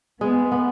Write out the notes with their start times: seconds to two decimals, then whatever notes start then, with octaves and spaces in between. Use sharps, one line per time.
0.21 G#3 B3
0.52 B3